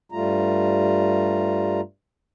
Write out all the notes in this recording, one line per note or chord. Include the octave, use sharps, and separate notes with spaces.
G2 G3 A3 F4 A#5